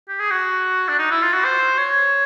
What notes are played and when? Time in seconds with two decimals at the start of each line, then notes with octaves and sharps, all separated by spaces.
0.09 G4
0.20 G#4
0.31 F#4
0.89 D4
0.99 D#4
1.11 E4
1.22 F4
1.33 F#4
1.45 C5
1.78 C#5